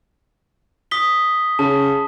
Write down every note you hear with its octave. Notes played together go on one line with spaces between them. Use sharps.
D#6 B6 G7
C#3 A5